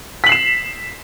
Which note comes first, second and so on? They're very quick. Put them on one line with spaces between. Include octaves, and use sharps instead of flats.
B6 F#7 C7 E7